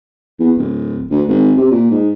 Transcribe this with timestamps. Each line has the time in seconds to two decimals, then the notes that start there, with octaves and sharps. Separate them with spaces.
0.40 E2
0.58 D1
1.11 D2
1.29 G#1
1.57 C3
1.71 A#2
1.91 G#2